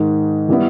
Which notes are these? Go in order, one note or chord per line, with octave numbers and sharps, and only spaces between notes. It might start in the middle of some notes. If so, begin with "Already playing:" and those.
Already playing: G#2 D#3 G#3
E3 G3 B3 E4